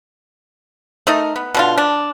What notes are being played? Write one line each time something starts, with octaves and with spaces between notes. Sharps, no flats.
A3 D#4 A#4
B3
B2 D3 F4
D4